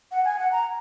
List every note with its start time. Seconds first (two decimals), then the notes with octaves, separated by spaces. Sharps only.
0.11 F#5
0.25 G#5
0.39 F#5
0.52 A#5